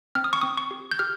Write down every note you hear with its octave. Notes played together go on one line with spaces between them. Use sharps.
C4 F6
D#6
C#6
C4 D#6
C#6
G4
G6
G4 F6